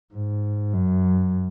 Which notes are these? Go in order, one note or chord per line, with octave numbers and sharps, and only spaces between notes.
G#2
F#2